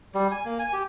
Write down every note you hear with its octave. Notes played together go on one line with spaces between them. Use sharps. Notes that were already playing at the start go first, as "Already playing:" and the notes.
G3
G#5
A#3
G#5
G4